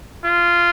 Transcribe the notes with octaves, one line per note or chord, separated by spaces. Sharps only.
F4